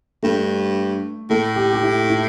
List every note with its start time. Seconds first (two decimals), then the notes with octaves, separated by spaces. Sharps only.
0.23 G2 A3
1.30 A2 A3
1.56 G4
1.73 G4
1.83 E4
2.10 E4